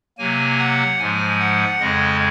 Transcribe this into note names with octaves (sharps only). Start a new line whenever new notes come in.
C3 F#3 A#3 G#5
F#5
G#2 F3 G#3 G#5
F#5
F2 C#3 G#3 D#5